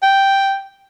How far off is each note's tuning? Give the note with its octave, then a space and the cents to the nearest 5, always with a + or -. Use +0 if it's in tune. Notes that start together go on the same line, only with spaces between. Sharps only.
G5 -5